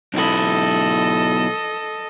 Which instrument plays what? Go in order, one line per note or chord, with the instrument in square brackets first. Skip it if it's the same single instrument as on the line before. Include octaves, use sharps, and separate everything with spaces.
[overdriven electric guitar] B1 E4 [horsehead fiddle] A4 D#5